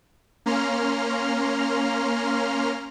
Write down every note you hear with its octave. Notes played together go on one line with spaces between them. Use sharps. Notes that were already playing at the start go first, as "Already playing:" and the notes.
A#3 C#4 A#5 C6 F6